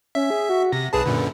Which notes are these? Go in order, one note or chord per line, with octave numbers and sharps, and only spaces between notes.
C#4 E5
G#4
F#4
C3 A#6
B1 G#4 B4 A5
F#2 A#2 D3